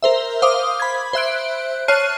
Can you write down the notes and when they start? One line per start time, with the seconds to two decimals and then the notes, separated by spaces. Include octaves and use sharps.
0.03 A#4 C5 E5
0.42 C5 F5 D6 D#6
0.80 B5 G#6
1.13 C5 E5 F#6 D7
1.88 C#5 A5 F6 F#6 C7 D#7